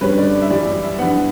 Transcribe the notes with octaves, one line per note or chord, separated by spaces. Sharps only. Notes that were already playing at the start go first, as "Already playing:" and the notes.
G2 D3 G3 C#4 B4
D5
E5
F#2 E3 G3 D5
E5
G2 E3 B3 F#5